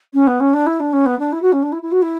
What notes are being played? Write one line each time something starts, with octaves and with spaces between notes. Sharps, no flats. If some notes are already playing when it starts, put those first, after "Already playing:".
C#4
B3
C#4
D4
E4
D4
C#4
B3
D4
E4
F#4
C#4
D4
E4
E4
F#4
E4